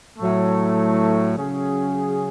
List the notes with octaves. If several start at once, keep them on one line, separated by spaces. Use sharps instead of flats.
A2 F#3 A3
C#3 F#3 C#4 G#4